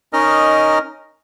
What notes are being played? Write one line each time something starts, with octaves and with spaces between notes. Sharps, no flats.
C#4 D#4 A#4 D#5 F6